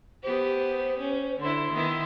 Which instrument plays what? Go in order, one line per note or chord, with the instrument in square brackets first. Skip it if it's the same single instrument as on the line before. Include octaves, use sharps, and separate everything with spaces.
[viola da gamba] B3 G4 [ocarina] C5
[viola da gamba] C#4
[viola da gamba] D3 E4 [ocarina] C6
[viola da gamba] D#3 B3 E4